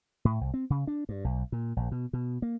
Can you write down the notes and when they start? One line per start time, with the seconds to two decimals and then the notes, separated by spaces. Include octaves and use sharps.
0.25 A2
0.41 C2
0.54 C4
0.70 C#3
0.87 D4
1.09 G2
1.24 B1
1.52 A#2
1.77 A#1
1.92 B2
2.13 B2
2.42 A#3